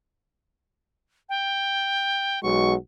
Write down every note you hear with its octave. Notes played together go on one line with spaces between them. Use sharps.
G5
B1 G#3 F#4 C#6